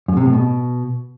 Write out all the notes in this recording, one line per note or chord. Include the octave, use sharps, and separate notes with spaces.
F#2
C3
A2
B2